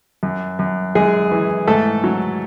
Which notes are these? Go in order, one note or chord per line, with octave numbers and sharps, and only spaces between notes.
F#2
F#2
F#2 G#3 G#4
E3
G#2 A3 A4
F#3